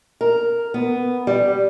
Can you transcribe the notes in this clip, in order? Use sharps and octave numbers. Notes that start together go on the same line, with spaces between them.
A#4
B3
G3